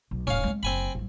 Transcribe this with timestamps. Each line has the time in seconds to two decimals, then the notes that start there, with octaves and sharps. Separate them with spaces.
0.11 B1
0.27 D#1 A2 C#4 F5
0.44 G#3 C4
0.63 F#1 C4 G#5 B5
0.95 A1 G3